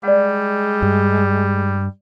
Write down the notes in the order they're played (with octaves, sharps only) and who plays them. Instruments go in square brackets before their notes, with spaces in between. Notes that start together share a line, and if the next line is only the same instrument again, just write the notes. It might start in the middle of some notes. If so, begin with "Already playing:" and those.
[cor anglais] G3 [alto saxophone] G#3 [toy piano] D5 F#5
[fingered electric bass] G2